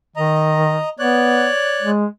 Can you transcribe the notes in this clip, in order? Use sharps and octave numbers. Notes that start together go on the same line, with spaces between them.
D#3 D#5 A#5
B3 C#5 D5 F#6
G#3